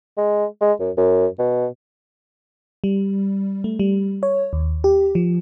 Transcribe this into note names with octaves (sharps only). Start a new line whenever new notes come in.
G#3
G#3
F#2
F#2
B2
G3
A3
G3
C#5
D#2
G4
F3